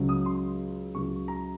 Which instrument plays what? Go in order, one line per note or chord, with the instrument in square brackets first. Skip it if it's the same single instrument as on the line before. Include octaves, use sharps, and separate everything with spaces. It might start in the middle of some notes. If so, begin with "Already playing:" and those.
Already playing: [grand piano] C#2 C#3 F#3
D#6
C6
C#2 C#3 F#3 C#6
A#5